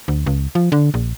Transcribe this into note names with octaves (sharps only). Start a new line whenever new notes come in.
D2
C#2
F3
D3
A#1